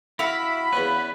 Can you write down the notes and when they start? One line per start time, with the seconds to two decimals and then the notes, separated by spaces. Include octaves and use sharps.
0.19 E4 F#4 E5 F5 B5
0.73 E2 B3 C#4 B4